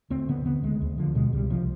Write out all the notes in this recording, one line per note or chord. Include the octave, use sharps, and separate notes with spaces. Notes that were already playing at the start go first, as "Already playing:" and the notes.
D2 C4
D3 B3
D3 B3
D2 G#3
D2
D3 F3
B2 G#3
C2 G3
C2 F3